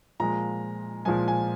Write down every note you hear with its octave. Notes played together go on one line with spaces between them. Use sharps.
A#2 F3 G#3 A#5
A#2 F3 G#3 G#5
G#5